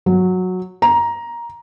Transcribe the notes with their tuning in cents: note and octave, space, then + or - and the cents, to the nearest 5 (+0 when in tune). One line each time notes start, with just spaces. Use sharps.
F#3 -10
A#5 +10